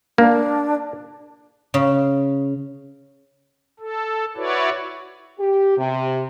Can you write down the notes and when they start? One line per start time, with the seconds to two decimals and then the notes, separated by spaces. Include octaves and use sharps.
0.18 A#3 D4
1.74 C#3
3.80 A4
4.37 E4 F#4 B4 C#5 D5
5.39 G4
5.77 C3